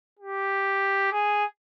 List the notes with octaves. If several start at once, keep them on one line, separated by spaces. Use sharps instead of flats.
G4
G#4